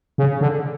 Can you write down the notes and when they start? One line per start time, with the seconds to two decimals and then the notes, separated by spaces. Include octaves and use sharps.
0.18 C#3
0.41 D3